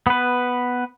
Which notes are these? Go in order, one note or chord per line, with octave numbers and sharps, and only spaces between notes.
B3 B4